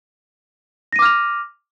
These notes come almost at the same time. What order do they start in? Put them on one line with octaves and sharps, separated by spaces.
A#6 D#7 D6 F6 F7